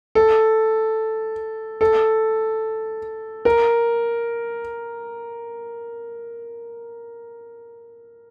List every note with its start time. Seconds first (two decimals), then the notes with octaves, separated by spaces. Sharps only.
0.15 A4
1.81 A4
3.45 A#4